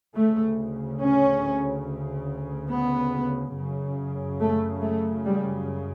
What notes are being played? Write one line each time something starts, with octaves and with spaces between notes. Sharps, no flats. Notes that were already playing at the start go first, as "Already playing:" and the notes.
D2 C#3 A3
C#4
B3
F#2 C#3
A3
A3
G3